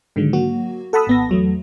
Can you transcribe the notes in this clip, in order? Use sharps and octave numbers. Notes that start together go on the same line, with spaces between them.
G#2 D3 D#3 F#3 G#3
F#3 A#3 F#4
A4 F#5 A5 B5 D#6 E6
G#1 B3 A#6
E2 F#3 A3